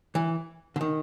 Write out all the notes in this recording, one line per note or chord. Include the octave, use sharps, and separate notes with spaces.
E3
D3
D#3